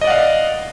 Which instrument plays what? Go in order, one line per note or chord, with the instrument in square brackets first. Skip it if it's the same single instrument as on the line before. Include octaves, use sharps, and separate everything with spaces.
[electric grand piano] D#5
D5
F#5
F5